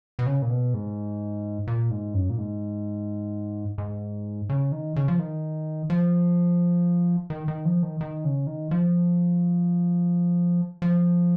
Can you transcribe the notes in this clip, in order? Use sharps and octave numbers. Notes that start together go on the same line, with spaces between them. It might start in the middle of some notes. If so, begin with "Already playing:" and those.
B2
C#3
A#2
B2
G#2
A#2
G#2
F#2
A#2
G#2
G#2
C#3
D#3
C#3
F3
D#3
F3
D#3
D#3
F3
D#3
D#3
C#3
D#3
F3
F3